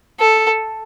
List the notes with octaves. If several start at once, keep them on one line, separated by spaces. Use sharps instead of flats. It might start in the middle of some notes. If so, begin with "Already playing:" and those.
A4